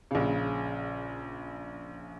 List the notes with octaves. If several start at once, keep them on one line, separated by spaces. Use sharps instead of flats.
A#1 C#3